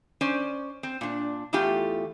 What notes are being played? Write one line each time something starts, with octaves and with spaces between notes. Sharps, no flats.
C#4 C5 D5
C4
A#2 D4
E2 E3 A3 F4 G4